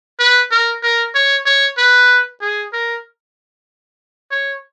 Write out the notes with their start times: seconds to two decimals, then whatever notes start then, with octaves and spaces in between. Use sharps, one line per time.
0.19 B4
0.51 A#4
0.83 A#4
1.15 C#5
1.46 C#5
1.78 B4
2.41 G#4
2.73 A#4
4.31 C#5